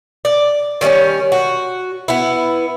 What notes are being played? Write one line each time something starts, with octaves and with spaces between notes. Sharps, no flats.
D5
D#3 G3 A3 C#4
F#4
B3 E4